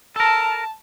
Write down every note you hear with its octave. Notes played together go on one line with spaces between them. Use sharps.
A4 A#4 A5